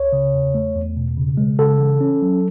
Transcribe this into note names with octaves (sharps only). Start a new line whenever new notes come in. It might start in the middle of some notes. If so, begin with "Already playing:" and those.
Already playing: C#2 C#5
C#3
E2
A3
E2
B2
C#3
G#3
C#3 A4
E3
C#4
F#3